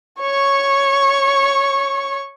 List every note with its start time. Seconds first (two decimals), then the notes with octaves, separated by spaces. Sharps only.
0.20 C#5 C#6